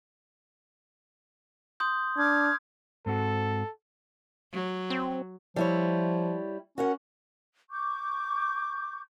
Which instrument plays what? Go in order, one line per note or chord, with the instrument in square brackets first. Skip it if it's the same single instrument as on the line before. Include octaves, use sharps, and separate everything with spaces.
[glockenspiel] C6 D#6 G6
[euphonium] D4 [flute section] D6 F6 G#6
[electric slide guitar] G#2 C4 F#4 [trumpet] A4
[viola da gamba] F#3
[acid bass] C4
[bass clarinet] F3 [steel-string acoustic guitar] G3 E4 C#5
[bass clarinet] C#4 [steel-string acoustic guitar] F#4 A#4 F#5
[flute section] C#6 D6 G6